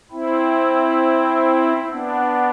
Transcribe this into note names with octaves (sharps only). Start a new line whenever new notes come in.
C4 E4
B3 D4